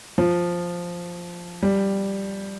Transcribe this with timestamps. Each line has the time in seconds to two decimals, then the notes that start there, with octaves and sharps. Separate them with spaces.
0.18 F3
1.62 G3